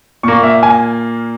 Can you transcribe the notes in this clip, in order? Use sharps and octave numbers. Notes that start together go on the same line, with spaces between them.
A#2 A#3 C#6
E5
G#5